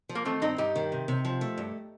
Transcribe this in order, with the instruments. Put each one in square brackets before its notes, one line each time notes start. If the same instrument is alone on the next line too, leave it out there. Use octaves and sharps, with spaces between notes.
[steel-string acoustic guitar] F3
[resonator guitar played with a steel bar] A#3
[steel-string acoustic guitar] D#3 [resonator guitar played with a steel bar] A3 C4
[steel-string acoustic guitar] G2 [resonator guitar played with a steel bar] C4 D#4
[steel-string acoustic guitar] G2 [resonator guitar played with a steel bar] D#4 G4
[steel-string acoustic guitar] D#3
C3
C3
F3
A3
G2